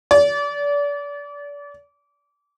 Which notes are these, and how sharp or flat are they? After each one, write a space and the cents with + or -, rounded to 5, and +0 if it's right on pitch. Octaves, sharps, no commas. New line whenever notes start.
D5 -30